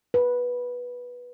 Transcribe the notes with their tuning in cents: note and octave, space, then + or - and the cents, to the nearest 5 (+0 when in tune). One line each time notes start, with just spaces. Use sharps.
B4 -10